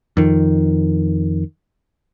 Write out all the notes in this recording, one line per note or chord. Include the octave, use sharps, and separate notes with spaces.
F2 D#3